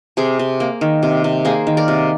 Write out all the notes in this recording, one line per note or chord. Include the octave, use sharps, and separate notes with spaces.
C3 G#4 C5
C3
A#3
D#3
C3
C3
A#3 G#4 C5
D#3
A#4 D5
C3